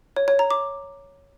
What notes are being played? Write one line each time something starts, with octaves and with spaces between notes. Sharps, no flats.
C#5
C#5
A#5
D6